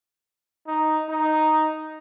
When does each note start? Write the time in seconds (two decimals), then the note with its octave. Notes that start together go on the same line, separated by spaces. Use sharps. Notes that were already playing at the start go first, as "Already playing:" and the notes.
0.67 D#4
1.09 D#4